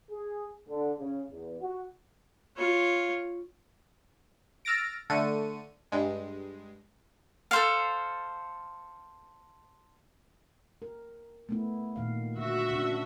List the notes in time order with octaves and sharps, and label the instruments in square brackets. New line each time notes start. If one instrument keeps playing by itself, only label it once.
[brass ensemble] G#4
D3
C#3
E2
F#4
[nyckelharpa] F4 C#5
[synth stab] E6 F6 A6 A#6 D7
D3 A3 C#7 D#7
G2 G#3
[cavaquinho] A4 C5 F5
[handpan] A#4
A3 B3 E4
A#2 D#3 F5
[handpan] D3 [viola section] F#4 E5
[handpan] C#3 C4 D4